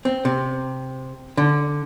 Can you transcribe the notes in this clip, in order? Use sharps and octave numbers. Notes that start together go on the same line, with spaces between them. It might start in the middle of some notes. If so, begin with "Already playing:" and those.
C4
C3
D3